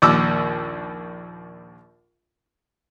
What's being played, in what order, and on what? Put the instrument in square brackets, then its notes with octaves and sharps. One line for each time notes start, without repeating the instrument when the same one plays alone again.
[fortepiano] A#1 D#2 D6 E6